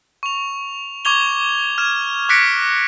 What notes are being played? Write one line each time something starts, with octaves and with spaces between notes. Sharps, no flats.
C#6 F7
C#6 D6 G#6 F7 G7
F6 G#6 E7
D6 F#6 A#6 B6 C#7 D7